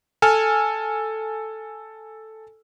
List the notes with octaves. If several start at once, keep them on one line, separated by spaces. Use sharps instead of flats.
A4 G#5 F6